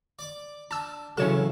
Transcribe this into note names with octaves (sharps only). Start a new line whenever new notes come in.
D5 D6
D4 A5 E6
C#3 E3 F#3 C#4 A4 C#5 E7